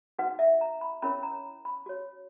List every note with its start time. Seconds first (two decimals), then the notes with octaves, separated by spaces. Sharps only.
0.19 D#4 F#4 B4 F#5
0.39 E5
0.61 A#5
0.81 B5
1.02 C#4 E4 A#4 C#5 B5
1.23 A#5
1.65 B5
1.86 F#4 C#5